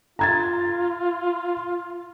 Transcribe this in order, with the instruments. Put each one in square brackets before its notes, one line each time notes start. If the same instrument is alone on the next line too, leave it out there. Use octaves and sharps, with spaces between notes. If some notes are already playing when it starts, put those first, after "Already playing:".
[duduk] F4 [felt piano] A#5 G#6 A6